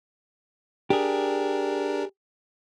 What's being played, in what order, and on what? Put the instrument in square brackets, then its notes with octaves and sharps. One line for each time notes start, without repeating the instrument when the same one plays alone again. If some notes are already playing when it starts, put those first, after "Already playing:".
[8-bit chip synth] D4 A#4 [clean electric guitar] G4 G#4